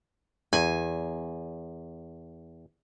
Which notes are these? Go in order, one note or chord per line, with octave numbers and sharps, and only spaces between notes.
E2 G#5